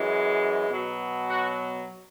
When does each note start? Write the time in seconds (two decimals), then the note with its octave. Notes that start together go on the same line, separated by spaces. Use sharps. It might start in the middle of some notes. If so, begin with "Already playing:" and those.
Already playing: F#2 E3 G#3
0.70 B2 F#3
1.29 F#4